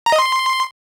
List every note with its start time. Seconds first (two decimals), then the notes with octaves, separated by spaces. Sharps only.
0.06 A#5
0.12 D#5
0.19 C6